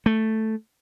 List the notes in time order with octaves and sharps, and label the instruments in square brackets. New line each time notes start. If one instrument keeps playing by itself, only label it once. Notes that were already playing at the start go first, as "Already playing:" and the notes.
[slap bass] A3